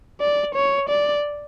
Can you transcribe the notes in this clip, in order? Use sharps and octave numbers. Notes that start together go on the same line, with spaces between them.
D5
C#5
D5